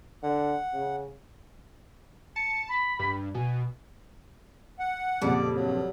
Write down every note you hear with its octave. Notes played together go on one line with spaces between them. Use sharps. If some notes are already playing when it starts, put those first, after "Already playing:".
D3 F#5
C#3
A5 C#7
B5
G2
B2 G#5
F#5
F2 A#2 C#3 G3 D5
G2 F#3